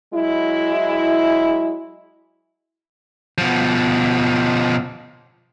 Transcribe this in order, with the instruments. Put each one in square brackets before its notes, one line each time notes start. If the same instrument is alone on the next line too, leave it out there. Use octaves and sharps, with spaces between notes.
[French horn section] F#3 G#3 E4
[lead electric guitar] B2 F3